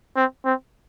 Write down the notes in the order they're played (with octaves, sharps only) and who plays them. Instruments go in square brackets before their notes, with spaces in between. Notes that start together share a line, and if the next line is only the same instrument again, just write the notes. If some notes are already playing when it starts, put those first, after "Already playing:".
[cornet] C4
C4